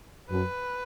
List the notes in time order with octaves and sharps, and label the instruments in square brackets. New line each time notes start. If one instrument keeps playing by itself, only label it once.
[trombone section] F#2 [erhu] B4